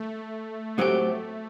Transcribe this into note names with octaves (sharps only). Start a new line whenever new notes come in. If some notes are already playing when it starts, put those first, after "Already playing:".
Already playing: A3
A2 F#3 C4 G4